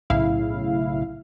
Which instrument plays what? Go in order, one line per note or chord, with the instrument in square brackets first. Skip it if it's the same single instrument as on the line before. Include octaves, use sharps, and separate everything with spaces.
[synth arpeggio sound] B1 A2 C#3 E4 F5